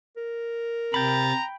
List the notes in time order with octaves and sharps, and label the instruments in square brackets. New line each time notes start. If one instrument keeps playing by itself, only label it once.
[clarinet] A#4
[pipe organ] C3 A6 [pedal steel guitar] G5 B5 [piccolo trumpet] A#5